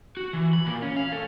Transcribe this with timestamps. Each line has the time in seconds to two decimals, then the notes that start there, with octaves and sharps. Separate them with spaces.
0.17 F#4
0.33 E3
0.54 B5
0.66 A#2
0.82 C#4
0.97 F5
1.13 A3